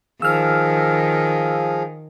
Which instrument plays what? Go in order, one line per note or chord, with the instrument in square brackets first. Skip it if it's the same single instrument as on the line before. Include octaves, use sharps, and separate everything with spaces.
[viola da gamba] D#3 [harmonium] F3 G#4 F5 [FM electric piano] E6 F6